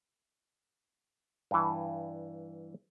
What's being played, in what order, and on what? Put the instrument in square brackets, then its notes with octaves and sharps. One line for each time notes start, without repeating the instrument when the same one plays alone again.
[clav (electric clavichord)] G2 E3